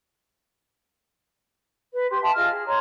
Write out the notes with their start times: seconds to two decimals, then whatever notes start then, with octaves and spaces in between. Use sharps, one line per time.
1.93 B4
2.09 G4 C6
2.22 E5 G5 A5 C6
2.35 F4 G#4 D#5 F6
2.49 G#4
2.66 C#5 D#5 A#5 C6